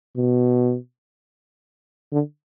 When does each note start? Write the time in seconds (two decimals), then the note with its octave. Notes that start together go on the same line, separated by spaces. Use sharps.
0.17 B2
2.13 D3